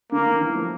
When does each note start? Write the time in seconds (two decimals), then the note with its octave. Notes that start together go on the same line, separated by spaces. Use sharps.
0.12 D3 A#3
0.26 D#3
0.41 E3
0.56 F3